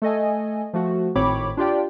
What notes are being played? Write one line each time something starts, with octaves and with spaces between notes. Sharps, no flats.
A3 A4 D#5 G#5
F3 A3 F#4
G#1 A2 C4 C#5 B5 D6
D4 F4 G4 D5 G5